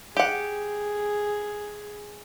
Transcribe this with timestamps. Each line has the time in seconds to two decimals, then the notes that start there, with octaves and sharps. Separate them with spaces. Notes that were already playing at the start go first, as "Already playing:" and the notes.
0.17 G4 G#4 F#5